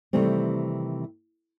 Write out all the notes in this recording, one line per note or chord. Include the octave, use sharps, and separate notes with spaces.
C3 D#3 E3 G3 A3 C4